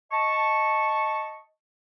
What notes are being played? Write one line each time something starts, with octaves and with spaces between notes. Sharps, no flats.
D#5 A5 C#6